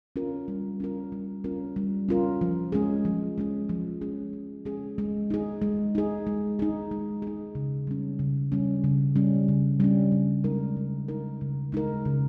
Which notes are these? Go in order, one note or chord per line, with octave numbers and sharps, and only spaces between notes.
C#4 F4 A#4
G3
C#4 F4 A#4
G3
C#4 F4 A#4
G3
C#4 F4 A#4
F3
G#3 C#4 G#4
F3
G#3 C#4 G#4
F3
G#3 C#4 G#4
F3
G#3 C#4 G#4
G#3
D#4 G#4
G#3
D#4 G#4
G#3
D#4 G#4
G#3
D#4 G#4
C#3
G3 C#4
C#3
G3 C#4
C#3
G3 C#4
C#3
G3 C#4
C#3
G#3 D#4 A#4
C#3
G#3 D#4 A#4
C#3
G#3 D#4 A#4
C#3